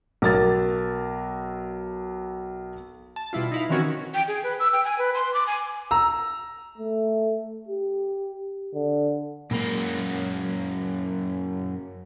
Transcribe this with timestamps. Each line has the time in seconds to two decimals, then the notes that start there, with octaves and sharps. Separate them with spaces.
0.22 B1 A#4 A6
3.16 A5
3.33 B2 G3 E4 F4
3.52 D#4 E4 F5
3.69 D#3 E3 C4 C#4 F#4 A#4
4.14 G5
4.28 G#4
4.43 B4
4.59 E6
4.73 G5
4.85 G#5
4.98 B4
5.14 C6
5.34 D6
5.47 G#5
5.91 A#5 E6
6.78 A3
7.68 G4
8.74 D3
9.51 F#2 A#2 G#3 A#3 B5